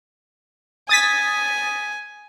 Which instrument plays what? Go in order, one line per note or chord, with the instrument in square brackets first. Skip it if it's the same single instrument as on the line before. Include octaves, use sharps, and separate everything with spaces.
[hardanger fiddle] G#5 [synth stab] D#6 A6 B6